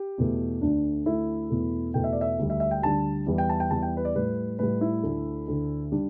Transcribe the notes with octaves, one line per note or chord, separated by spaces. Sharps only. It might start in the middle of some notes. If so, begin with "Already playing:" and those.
Already playing: G4
E2 B2 A3
D2 D3 A3 D4
D2 D3 A3 E4
E2 B2 A3
E2 B2 A3 G5
E5
D5
E5
D2 D3 G3
E5
E5
G5
D2 D3 G3 A5
E2 E3 G3
G5
A5
G5
E2 E3 G3 A5
G5
B4
D5
A2 G3 B4
A2 G3 B4
E4
D2 D3 A3
D2 D3 A3
G3 D4